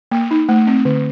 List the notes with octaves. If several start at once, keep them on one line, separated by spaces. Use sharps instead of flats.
A#3
D#4
A3
C4
D3